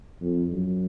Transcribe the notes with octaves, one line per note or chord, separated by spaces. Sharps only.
F2
F#2